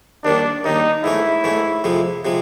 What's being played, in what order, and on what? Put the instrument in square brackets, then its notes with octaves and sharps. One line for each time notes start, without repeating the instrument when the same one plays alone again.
[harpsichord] D#2 D#3 G3 [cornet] D4
[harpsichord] D#2 D#3 G3 [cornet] D#4
[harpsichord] G#2 E3 A3 C#4 [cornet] E4
[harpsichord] G#2 E3 A3 C#4
F2 C3 F3 G#3
C3 F3 G#3